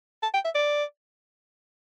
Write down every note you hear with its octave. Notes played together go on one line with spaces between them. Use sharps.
A5
G5
E5
D5